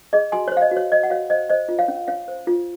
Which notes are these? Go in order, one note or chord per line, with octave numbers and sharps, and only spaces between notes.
G#4 D#5
F#4 G#5 C6
C5 C#5
F5
D#5
F#4
C#5
C5 D#5
F#5
F#4 C#5 F5
C5 D#5
C5 D#5
F4
C#5 F5
C#4
C#4 C#5 F5
C5
F4